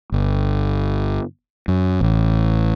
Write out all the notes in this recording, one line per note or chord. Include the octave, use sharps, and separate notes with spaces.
G1
F#2
A1